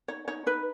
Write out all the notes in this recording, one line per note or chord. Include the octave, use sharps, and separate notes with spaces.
D#4 C#5
D#4 C#5
D#4 B4